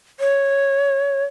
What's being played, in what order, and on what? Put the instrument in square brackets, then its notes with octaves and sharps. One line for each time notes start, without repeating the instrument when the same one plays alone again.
[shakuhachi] C#5